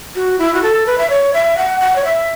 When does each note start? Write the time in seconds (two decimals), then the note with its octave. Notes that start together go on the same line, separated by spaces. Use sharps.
0.15 F#4
0.39 E4
0.54 F#4
0.62 A4
0.86 B4
0.98 E5
1.10 C#5
1.34 E5
1.57 F#5
1.81 F#5
1.96 C#5
2.04 E5